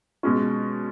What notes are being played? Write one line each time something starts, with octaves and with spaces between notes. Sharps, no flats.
B2 G#3 C#4